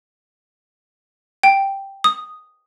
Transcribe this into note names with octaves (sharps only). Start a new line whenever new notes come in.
G5
D#6